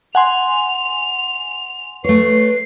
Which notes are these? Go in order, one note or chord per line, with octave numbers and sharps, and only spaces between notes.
F#5 G#5 C6 F7
A3 B4 C#5 C7